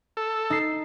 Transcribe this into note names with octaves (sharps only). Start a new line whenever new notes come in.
A4
D#4 C7